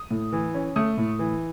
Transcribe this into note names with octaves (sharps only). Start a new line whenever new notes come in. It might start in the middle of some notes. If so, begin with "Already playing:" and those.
Already playing: D#6
A2
E3
C#4
A3 D#6
A2
E3